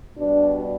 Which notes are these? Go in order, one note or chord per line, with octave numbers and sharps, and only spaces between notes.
B2 G3 D4